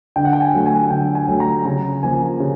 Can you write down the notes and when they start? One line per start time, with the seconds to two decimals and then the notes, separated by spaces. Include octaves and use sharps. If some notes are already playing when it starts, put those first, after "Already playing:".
0.16 D3 G5
0.25 F#5
0.33 G5
0.41 G#5
0.53 F#3 A3
0.66 G#5
0.90 D3 G5
1.15 G#5
1.28 F#3 A3
1.40 A#5
1.65 C#3 A#5
2.03 F3 A#3 G#5
2.40 C#3